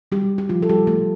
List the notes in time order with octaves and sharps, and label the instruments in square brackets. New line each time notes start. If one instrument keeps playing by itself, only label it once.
[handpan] G3 G4
G4
F3 F4
A4
G3 G4
A3